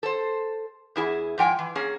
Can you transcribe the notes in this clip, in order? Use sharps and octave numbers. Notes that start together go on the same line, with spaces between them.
A4 C5
E2 E4 G#4
G#2 F3 G5 G#5
E3
A#3 C#4 G#4